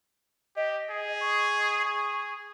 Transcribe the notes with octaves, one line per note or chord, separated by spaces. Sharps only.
G4 D#5
G#4
C#6
G#4